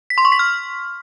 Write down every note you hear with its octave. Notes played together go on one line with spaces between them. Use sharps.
B6
C6
C#6
B6
F6